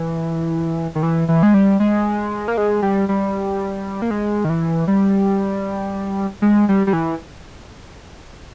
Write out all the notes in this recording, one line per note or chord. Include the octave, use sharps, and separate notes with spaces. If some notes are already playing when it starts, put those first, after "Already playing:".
Already playing: E3
D#3
E3
E3
G#3
G3
G#3
A#3
G#3
G3
G3
A#3
G#3
D#3
E3
G3
G#3
G3
G3
E3